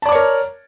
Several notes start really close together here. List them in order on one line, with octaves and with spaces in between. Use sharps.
A5 D5 D6 C#5 A#4